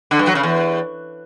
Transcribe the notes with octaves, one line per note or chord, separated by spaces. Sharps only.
D3
G2
F#3
C#3
E2